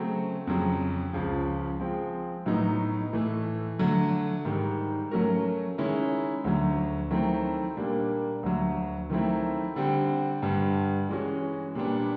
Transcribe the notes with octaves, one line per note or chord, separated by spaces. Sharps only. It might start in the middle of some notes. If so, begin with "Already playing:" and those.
Already playing: C#3 F#3 A3 C4
F2 C#3 F#3
C#2 C#3 F3
F3 G#3 C4
A2 F#3 B3 D#4
A2 E3 A3
D3 F#3 A3
G#2 D#3 G3
F#3 A3 C#4 F#4 A#4
D#3 G#3 C#4 E4
D2 D3 F#3
D#3 F#3 A3 C4 E4
A#2 G3 A#3 D4
D2 D3 F#3
D#3 F#3 A3 C4 E4
D3 G3 C4
G2 D3 G3
E3 G#3 C#4 F#4
A#2 G3 B3 D4